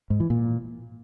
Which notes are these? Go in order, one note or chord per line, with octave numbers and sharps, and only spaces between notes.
G#2
E3
A#2